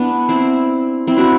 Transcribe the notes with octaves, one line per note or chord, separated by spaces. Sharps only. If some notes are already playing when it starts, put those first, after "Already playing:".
Already playing: B3 D4 E4
C4 E4
C4 E4
D4 F#4